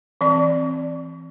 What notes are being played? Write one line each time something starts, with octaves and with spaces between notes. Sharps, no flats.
E3 C4 D5